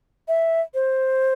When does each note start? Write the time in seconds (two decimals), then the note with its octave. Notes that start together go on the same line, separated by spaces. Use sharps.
0.28 E5
0.74 C5